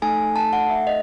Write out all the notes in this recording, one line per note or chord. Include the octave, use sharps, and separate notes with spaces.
A3 D#4 A4 G#5
A5
F#5
E5
D#5